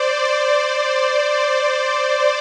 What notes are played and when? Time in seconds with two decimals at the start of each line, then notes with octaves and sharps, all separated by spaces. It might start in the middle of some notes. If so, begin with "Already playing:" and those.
Already playing: C5 D5
0.25 D5